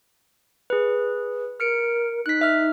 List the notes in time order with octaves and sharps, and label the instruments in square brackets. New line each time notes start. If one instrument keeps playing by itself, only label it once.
[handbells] G#4 B4
[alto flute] A#4 [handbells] F6 C#7 D7
[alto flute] D#4 [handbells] F#6 B6
[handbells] E5 F6